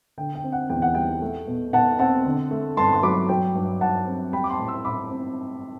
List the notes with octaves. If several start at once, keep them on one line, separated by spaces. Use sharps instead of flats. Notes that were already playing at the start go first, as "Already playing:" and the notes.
D3 G5
G5
C4
F#5
E2 G5
F#5
G3 G5
A3
B2
B2 F#5 A5
C4 F#5 A5
D3
A3
G2 A5 C6
C6
F#3 B5 D6
F#3 G5
G2
G2 F#5 A5
C4
G3 G5 B5
D6
A5 C6
A2
C6 E6
A2 B5 D6
C4